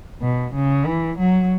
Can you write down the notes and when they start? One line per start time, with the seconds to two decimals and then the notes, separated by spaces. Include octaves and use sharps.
0.22 B2
0.54 C#3
0.86 E3
1.18 F#3